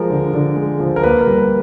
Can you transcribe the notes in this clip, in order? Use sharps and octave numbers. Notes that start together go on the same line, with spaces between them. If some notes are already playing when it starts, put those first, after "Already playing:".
Already playing: F3 G#3 A#4
D3
D3
G#3
F3
A#4
A#3 B4
A#4
G3
B4